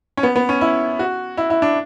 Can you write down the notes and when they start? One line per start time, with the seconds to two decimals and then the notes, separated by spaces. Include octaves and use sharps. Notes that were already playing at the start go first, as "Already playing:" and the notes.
0.17 C#4
0.23 B3
0.36 B3
0.49 C#4
0.61 E4
0.99 F#4
1.37 E4
1.50 E4
1.62 D4